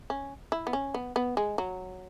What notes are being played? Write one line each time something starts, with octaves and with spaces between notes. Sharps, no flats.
C#4
E4
B3
C#4
B3
B3
G#3
F#3